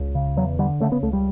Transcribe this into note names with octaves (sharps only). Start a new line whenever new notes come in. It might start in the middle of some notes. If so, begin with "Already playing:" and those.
Already playing: C#2
C#3
E2 F#3
D3 G3
C#3 A3
B3
C#2 A3
G3